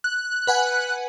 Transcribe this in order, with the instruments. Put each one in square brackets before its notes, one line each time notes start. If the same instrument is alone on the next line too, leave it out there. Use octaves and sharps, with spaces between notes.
[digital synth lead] F#6
[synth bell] B4 F#5 G#5